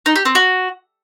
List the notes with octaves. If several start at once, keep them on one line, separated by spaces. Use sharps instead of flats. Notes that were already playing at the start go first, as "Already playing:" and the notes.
D#4
G4
C4
F#4